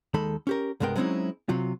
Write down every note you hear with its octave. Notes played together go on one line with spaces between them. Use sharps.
D#2 D#3 G#3 A4 B5
C#4 G4 A#4
C2 G2 G#3 B3 A#4 G5
F#3 G#3 C4 C#4 D#4 E4
C3 F#3 F4